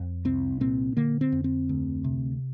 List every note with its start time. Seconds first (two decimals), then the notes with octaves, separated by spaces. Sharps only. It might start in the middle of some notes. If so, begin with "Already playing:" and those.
Already playing: F2
0.25 C2 C4
0.61 A#2 C4
0.97 D3 A#3
1.21 C4
1.32 F2
1.44 C4
1.69 D2
2.04 C3